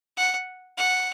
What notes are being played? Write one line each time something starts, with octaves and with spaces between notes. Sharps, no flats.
F#5
F#5